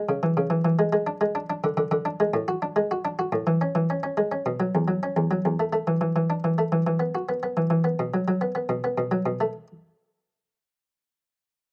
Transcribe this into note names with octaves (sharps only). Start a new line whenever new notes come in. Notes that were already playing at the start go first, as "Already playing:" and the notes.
Already playing: G#3
C#3
E3
C#3
E3
E3
G#3
G#3
D4
G#3
D4
D4
D3
D3
D3
D4
G#3
A2
F#4
D4
G#3
F#4
D4
F#4
A2
E3
C#4
E3
C#4
C#4
G#3
C#4
B2
F#3
E2
F#3
C#4
E2
F#3
E2
A3
A3
E3
E3
E3
D4
E3
A3
E3
E3
B3
F#4
B3
B3
E3
E3
B3
B2
F#3
F#3
B3
B3
B2
B3
B2
F#3
B2
A3